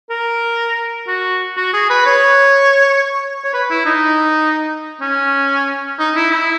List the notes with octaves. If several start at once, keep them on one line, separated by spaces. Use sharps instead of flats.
A#4
F#4
F#4
G#4
B4
C#5
C#5
B4
E4
D#4
C#4
D#4
E4
E4